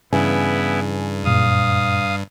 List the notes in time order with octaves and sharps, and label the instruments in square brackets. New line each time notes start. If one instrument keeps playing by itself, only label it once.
[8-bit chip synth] G2 [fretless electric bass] C#3 E3 [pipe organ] B3 E4 [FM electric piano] G#5
[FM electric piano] F#2 A#2 [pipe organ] F5 D#6